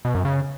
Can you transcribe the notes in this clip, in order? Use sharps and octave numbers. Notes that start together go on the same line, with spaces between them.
B2
F#2
C#3